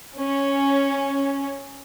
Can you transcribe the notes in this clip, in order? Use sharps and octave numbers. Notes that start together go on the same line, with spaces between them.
C#4